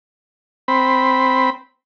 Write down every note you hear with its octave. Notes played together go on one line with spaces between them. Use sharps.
C4 B5